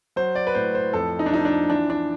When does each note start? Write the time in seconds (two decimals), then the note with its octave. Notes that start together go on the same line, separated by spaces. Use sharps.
0.16 F#3 C5
0.35 D5
0.47 B4
0.55 A2 C5
0.75 C5
0.93 F2 A4
1.19 D#4
1.26 D4
1.32 F3 D#4
1.45 D4
1.70 E3 D4
1.90 D4